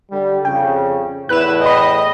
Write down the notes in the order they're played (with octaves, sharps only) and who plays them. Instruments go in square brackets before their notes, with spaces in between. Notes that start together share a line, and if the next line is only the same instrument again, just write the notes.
[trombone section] D3 G3
[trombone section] F2 C#3 [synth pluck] G5
[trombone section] E2 A2 [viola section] E4 B4 [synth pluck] F#6 E7
[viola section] D#5 [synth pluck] G5 B5